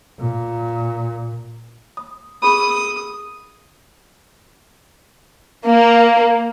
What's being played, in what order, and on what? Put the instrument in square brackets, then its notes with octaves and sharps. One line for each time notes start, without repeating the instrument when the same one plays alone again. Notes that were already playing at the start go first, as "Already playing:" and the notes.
[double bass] A#2
[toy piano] D#6
[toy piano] G#4 A#4 B5 [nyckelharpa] D#6
[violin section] A#3